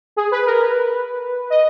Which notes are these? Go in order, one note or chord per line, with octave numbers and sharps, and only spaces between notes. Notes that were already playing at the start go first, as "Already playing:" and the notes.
G#4
B4
A#4
B4
D#5